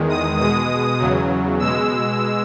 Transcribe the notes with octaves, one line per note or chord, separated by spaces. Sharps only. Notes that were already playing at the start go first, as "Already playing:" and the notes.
Already playing: E2 D#3 G#3
D#6
B2 G#3 D#6
E2 C#3 F#3
B2 G#3 E6